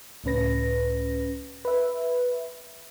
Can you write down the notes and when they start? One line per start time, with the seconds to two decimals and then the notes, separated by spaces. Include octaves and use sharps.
0.24 C#2 A2 C#4 B4 A#6
1.65 B4 E5